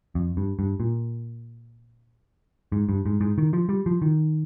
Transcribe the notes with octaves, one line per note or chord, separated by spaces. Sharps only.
F2
G2
G2
A#2
G#2
G2
G#2
G#2
D#3
F3
G3
F3
D#3